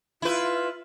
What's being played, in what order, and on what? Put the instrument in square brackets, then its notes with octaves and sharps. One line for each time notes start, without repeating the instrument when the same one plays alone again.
[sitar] E4 B4 [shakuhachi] F4